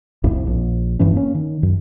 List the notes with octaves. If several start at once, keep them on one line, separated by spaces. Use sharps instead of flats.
C2 F2 A2
A#1
E1 G2 E3 C#4
A#3 C#4
D#3
F#2